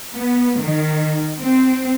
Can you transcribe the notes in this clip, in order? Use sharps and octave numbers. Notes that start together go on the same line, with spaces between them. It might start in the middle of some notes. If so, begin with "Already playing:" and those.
B3
D#3
C4